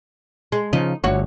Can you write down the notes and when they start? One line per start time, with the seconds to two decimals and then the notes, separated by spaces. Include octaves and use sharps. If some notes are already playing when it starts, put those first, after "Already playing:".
0.52 G#3
0.73 C#3 F3 D#4
1.04 G1 D2 F#4 C#5